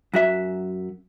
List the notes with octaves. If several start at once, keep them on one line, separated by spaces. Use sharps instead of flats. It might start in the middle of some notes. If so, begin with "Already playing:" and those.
F#2 F#4 E5